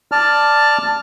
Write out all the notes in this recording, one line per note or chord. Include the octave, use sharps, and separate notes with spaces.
D5 A5 F6